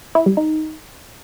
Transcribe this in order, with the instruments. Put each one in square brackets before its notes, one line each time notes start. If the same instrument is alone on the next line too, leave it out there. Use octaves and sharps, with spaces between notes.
[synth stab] E4
G3
D#4